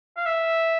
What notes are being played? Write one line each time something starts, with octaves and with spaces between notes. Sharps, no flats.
F5
E5